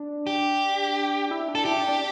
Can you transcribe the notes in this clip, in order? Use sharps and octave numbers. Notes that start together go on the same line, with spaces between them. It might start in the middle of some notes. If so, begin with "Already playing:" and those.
Already playing: D4
G4
E4
D4
A4
E4 G4
D4
D4